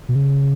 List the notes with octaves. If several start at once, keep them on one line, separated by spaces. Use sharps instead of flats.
B2
C#3